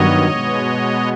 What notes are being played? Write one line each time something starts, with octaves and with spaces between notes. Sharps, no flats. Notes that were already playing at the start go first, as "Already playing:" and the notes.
Already playing: G2 D#3 F#3 B3 C#5 D#5
B2 G#3 B3